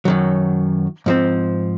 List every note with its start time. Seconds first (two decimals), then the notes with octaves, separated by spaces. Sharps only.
0.05 F#2 D#3 F#3
1.06 G#2 F3 C4